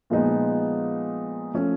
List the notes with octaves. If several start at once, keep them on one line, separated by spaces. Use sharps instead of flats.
A#2 F3 G#3 B3 D#4
F3 A3 C#4